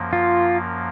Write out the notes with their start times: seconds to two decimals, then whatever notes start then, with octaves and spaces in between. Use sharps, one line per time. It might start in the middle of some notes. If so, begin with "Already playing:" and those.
Already playing: F#2 F3 A#3
0.13 F4